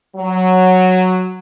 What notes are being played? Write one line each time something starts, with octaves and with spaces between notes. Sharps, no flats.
F#3